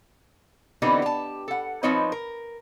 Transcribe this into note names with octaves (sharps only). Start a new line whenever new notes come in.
D3 E3 B3 C4 D#4 G4
G4 A5
A4 F#5
F3 C4 D#4 B4 C#5 D#5
A#4